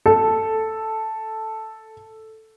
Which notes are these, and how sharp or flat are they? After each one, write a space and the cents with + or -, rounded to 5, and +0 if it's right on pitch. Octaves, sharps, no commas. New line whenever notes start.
A4 +0